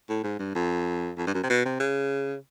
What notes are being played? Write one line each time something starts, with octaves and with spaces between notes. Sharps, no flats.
A2
G#2
G2
F2
F2
G2
F#2
C3
B2
C3
C#3